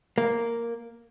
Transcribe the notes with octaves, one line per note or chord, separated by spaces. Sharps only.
A#3